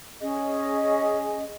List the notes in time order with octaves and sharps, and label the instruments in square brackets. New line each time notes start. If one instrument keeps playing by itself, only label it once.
[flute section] C#4 G#4 D#5